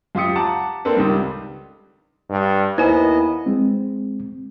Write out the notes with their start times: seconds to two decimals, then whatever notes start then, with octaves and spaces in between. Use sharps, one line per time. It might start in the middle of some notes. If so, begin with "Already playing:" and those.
0.15 F#2 F4 G4 D#6 C#7
0.36 F#5 A5 A#5 D6
0.85 A#3 C4 D4 A4 B4
0.96 C#2 D#3 G3
2.29 G2
2.78 D#2 B3 E4 C5 D#5 G#5
3.46 G#3 C4